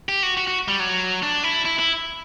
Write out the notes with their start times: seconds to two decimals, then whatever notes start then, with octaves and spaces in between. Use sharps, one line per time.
0.09 G4
0.23 F#4
0.37 F#4
0.48 F#4
0.68 G3
0.80 F#3
1.23 D4
1.43 E4
1.65 E4
1.79 E4